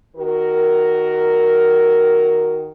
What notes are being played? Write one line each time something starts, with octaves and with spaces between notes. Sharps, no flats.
D#3 F#4 A#4